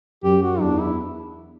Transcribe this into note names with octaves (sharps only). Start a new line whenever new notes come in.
F#2 G4
F#4
E2 D4
E4